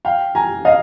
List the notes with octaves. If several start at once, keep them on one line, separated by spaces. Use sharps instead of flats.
F5 G5
G#5 A#5
D#5 F5